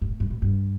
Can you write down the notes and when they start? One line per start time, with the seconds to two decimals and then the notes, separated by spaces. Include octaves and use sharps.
0.01 G2
0.09 A2
0.20 G2
0.30 A2
0.42 G2